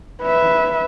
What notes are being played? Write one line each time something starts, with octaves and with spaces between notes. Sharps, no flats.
B4 E5